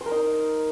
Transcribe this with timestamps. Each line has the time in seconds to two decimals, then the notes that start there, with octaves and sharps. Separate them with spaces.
0.01 C5
0.06 A#4
0.11 D#4